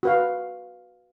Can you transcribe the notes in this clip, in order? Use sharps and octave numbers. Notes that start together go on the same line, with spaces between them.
F#4 B4 F5